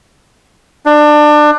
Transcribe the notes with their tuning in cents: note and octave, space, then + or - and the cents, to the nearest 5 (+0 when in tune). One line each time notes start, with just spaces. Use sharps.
D4 +25